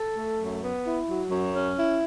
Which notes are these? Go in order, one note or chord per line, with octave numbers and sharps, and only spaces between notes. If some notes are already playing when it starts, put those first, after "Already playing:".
Already playing: A4
A3
F#2
B3
E4
F#3
F#2
C#4
E4